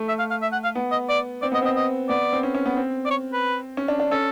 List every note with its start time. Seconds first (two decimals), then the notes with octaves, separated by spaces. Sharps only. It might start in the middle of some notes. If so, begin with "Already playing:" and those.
Already playing: A3
0.09 E5
0.19 F5
0.31 F5
0.42 E5
0.53 F#5
0.64 F5
0.75 B3
0.92 D#5
1.09 D5
1.42 C4 D5
1.52 B3 D#5
1.62 C4 D#5
1.76 D#5
2.09 B3 D5
2.33 C4
2.43 C#4
2.55 C#4
2.66 B3
2.77 C4
3.06 D5
3.11 C#5
3.33 B4
3.77 C#4
3.88 D4
4.00 D4
4.12 C#4 A4